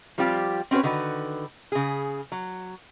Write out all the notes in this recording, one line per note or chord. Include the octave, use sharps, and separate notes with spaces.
F3 G3 C4 F4 G4
C4 C#4 F#4 B4 C#5
D3 D#3 F#4 B4
C#3 G#4
F#3